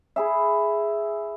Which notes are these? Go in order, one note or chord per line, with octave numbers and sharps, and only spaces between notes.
E4 G#4 E5